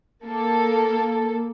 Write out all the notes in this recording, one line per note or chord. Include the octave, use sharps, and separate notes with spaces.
A#3 A4